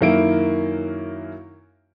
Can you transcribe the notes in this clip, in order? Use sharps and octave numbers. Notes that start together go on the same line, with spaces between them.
F#2 D#3 A#3 E4 D7